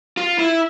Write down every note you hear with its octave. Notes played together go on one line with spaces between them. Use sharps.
F4
E4